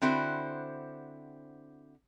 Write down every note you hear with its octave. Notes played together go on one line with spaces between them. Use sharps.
D3 C4 E4 F#4 C5